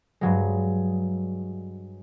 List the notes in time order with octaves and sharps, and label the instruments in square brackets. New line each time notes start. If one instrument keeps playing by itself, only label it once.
[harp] G2 F#3 G#3